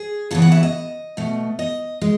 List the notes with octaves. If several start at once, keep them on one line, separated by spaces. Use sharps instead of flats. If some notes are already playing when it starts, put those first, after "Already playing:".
Already playing: G#4
D#2 C#3 E3 B3 A4
F#5
E5
D#5
B2 A3
D#5
G#3